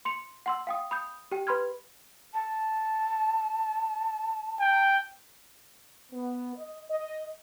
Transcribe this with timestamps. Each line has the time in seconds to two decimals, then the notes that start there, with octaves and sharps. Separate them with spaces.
0.05 C6 C#7 F7
0.46 F#5 C6 E6
0.67 F5 G5 D#6
0.91 B5 D#6 G6
1.32 G4 G5
1.47 B4 B5 C6 F6 G#6
2.34 A5
4.60 G5
6.11 B3
6.55 D#5
6.89 D#5